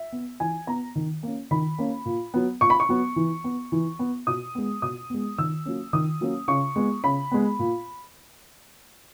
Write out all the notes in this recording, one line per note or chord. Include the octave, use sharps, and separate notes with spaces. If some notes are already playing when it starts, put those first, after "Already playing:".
Already playing: E5
B3
E3 G#5
B3 A#5
D#3
A#3 C#4
D#3 B5
A#3 C#4
A#2
F#3 B3
A#2 C#6
B5
C#6
F#3 B3
E3
B3
E3
B3
B2 D#6
G#3 B3
B2 D#6
G#3 B3
D#3 E6
F#3 A#3 C#4
D#3 D#6
F#3 A#3 C#4
C#3 C#6
G#3 B3
C#3 B5
G#3 B3
A#2